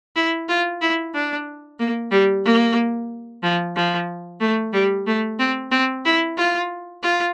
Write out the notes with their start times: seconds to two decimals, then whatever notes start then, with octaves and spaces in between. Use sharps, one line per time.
0.16 E4
0.49 F4
0.82 E4
1.14 D4
1.79 A#3
2.12 G3
2.45 A#3
3.43 F3
3.76 F3
4.41 A3
4.73 G3
5.07 A3
5.39 C4
5.71 C4
6.05 E4
6.37 F4
7.03 F4